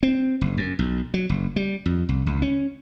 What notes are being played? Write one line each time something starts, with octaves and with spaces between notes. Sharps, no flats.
C4
F#1
F#2
B1
F#3
F#1
G3
F2
C2
C#2
C#4